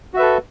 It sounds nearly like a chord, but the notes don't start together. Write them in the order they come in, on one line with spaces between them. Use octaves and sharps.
F#4 E5 B4 A4